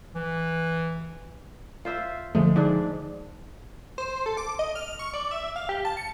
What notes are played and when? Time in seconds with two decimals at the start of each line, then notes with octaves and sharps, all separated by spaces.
0.15 E3
1.85 F4 C5 E5
2.35 D3 F3 G#3 A3
2.56 G#2 D4
3.98 C5
4.26 A4
4.37 D6
4.59 D#5
4.75 F6
4.99 C#6
5.14 D5
5.31 E5
5.56 F5
5.69 G4
5.85 A5
5.97 C#7